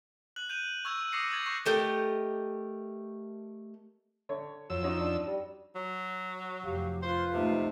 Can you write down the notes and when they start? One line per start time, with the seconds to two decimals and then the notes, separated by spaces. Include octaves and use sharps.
0.36 F#6 F#7
0.49 G6 D#7 F7
0.85 C#6 E6 G#6 F7
1.12 D6 D#6 A#6 C7 C#7
1.32 G#6 A6 F#7
1.46 C#6 F#6 A#6
1.66 A3 G4 A#4 D#5
4.29 D3 C#5
4.70 F2 F#3 E6
4.83 C#4 D#4 F#4
5.00 D4
5.27 G3
5.75 F#3
6.64 F1 G4 F5
7.02 F4 B4 C5
7.33 C3 A3 D#4